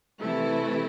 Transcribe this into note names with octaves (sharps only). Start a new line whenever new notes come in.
C3 E3 A3 E4